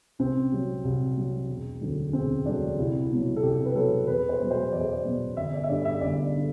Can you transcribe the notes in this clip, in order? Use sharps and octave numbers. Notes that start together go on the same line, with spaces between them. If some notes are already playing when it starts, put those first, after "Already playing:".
C2 C4
C3 F#3
C2
C3 F#3
E1
D2 D3 F#3
E1 C4
D2 D3 F#3 D4
C2 E4
B2 F#3
A4
C2 G4
B4
B2 F#3 A4
E2 B4
C5
B2 F#3
C5
E2 D5
C5
D5
B2 F#3
G1 E5
D5
E5
G2 D3 D5
E5
G1 D5
D3